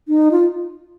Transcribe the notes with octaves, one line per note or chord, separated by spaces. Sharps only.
D#4
F4